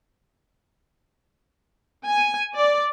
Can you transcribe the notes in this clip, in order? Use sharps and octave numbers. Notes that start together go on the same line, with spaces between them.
G#5
D5